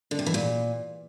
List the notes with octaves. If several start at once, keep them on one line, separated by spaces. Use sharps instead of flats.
D3
C3
E3
A#2